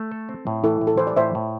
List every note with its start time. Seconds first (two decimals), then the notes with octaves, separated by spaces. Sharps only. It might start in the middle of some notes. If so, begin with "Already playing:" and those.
Already playing: A3
0.11 A4
0.29 C4
0.47 A2
0.64 E3 E4 A4
0.81 A2
0.87 A4
0.98 E3 C5
1.07 D5
1.16 A2 C5 E5
1.35 A2